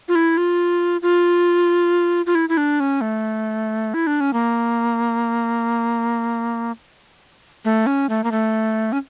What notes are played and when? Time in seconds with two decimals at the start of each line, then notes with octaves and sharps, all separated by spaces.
0.08 F4
0.15 E4
0.37 F4
1.02 F4
2.26 F4
2.35 E4
2.49 E4
2.57 D4
2.80 C#4
3.01 A3
3.94 E4
4.07 D4
4.21 C#4
4.33 A#3
7.65 A3
7.86 C#4
8.09 A3
8.24 A#3
8.31 A3
8.92 C#4